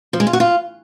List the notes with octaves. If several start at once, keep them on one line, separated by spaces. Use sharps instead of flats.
F3
G#3
F4
F#4
F4